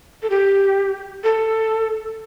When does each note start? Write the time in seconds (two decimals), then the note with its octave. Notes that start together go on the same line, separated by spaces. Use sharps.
0.22 A4
0.30 G4
1.24 A4